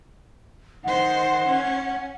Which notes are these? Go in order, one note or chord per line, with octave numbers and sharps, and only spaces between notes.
D#3 C5 F#5
C#4